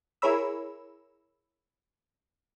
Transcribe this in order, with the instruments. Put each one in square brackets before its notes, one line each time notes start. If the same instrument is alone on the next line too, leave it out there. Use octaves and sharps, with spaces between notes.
[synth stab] E4 G#4 A#4 C#5 B5 E6